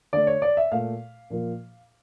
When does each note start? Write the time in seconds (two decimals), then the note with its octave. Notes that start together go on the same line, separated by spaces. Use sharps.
0.13 D3 A3 D5
0.27 C#5
0.42 D5
0.57 E5
0.72 A#2 A3 F5
1.30 A#2 F3 A#3